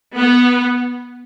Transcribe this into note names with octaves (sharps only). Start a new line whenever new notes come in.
B3